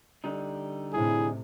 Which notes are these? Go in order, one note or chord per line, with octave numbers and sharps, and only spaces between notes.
D3 G3 D#4
A2 C3 E4 G#4